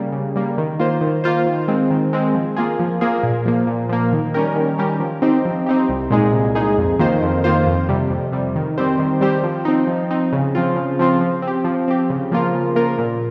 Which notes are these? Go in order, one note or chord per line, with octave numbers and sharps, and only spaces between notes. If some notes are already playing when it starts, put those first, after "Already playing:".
Already playing: C#3 G3 A#3
C#3
G3 A#3
D#3
A#3 F4 C5
D#3
A#3 F4 C5
D#3
G#3 C4
D#3
G#3 C4
F3
A#3 F4 G#4
F3
A#3 F4 G#4
A#2
F3 A#3
A#2
F3 A#3
D#3
G3 C#4 G4 A#4
D#3
G3 C#4 G4 A#4
F3
C4 D#4 G4
F3
C4 D#4 G4
C2
A#2 G#3 D#4 G#4
C2
A#2 G#3 D#4 G#4
F2
D#3 A#3 F4 C5
F2
D#3 A#3 F4 C5
F2
C3 G3
F2
C3 G3
D#3
G3 C4 G4 C5
D#3
G3 C4 G4 C5
F3
C4 D#4
F3
C4 D#4
C#3
F3 C4 F4
C#3
F3 C4 F4
F3
C4
G4
F3
C4 G4
C#3
F3 A#3 F4 A#4
C#3
F3 A#3 F4 A#4
A#2